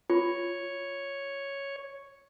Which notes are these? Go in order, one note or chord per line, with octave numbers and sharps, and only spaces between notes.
F4 C#5